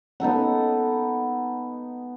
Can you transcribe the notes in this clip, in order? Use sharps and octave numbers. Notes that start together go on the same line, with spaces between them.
B3 D#4 A4 F#5